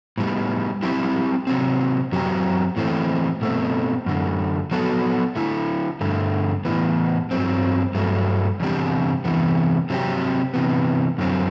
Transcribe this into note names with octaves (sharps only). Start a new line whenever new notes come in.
A2 G3 B3
F#3 C4 E4 G4
C3 F#3 C4
F#2 F#3 C4 G4
A2 E3 A3 C4
B2 A3 C4
F#2 D3 A3
F#3 B3 F#4 A4
D3 A3 E4
G2 D3 A3
A2 E3 B3
G2 F#3 C4
G2 F#3 A3
E2 C3 G3 D4 G4
E2 C3 E3 B3
C3 F#3 C4 G4
C3 E3 B3
F#2 D3 F#3 A3 C4